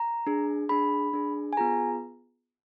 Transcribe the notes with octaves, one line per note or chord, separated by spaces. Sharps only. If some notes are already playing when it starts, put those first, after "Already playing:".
Already playing: A#5
D4 G#4
D4 G#4 B5
D4 G#4
G#5
B3 F4 G#4 A#5